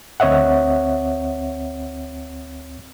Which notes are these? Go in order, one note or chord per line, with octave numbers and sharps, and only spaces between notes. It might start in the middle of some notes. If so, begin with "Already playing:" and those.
D2 C4 C#5 D#5 E5 F#5